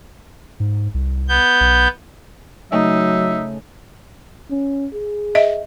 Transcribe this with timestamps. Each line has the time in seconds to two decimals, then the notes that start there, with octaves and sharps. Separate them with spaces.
0.60 G#2
0.94 C2
1.28 B3 G6
1.60 B1
2.72 C#3 F#3 A3 D#4 E5
4.51 C#4
4.93 G#4
5.35 D#5 E5